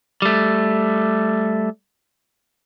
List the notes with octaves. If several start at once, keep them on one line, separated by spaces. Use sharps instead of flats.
G3 A3